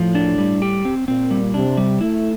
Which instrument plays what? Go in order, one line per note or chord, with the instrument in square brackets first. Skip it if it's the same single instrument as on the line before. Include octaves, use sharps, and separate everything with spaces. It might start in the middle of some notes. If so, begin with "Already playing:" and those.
Already playing: [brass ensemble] A2 [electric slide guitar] F3
[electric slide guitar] D4
G3
G4
C4
[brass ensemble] A#2 [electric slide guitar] C4
[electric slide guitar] G3
[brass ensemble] C3 [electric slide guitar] D4
[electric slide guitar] G3
[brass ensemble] A3 [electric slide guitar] E4